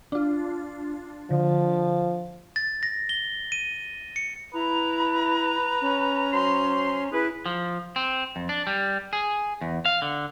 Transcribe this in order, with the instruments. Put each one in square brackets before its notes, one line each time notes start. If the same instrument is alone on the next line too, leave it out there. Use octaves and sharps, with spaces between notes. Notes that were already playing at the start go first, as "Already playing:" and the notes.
[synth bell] D4 F4
[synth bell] D3 [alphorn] F3
[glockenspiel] A6
A#6
G7
D#7
C#7
[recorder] E4 [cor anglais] B4 [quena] A#5
[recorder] C#4
[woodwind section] F#3 C5 C6
[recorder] E4 [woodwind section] G#4 B4
[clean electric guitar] F3
C4
F2
D4
G3
G#4
E2
F5
D3